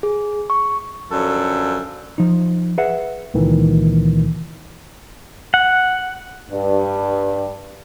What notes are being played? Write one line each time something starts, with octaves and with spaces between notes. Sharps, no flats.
G#4
C#6
F#2 D3 F3 C#4 A4
F3 D#4
G#4 B4 E5 F#5
C#2 A#2 D#3 E3
F#5
G2